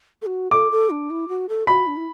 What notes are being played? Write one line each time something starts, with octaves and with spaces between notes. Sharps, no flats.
A4
F#4
A4 D6
A4
D4
E4
F#4
A4
F#4 B5
D4
E4